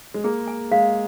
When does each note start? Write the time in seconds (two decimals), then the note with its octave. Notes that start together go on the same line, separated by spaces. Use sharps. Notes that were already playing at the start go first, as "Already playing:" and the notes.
0.14 G#3
0.24 A#3 G#4
0.47 G#5
0.71 G#3 F5